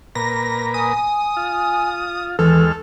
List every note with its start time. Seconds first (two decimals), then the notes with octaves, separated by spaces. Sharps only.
0.15 A#2 A#4 B4 A#6
0.74 G#5 D#6
1.37 F4
2.39 D#2 E3 G#3 A4 F6